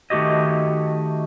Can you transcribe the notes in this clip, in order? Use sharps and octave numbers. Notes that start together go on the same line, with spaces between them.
D#3 A3 F#4 G4 D#5